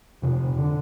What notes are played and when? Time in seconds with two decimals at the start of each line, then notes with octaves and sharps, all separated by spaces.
0.22 F2 C3
0.58 D3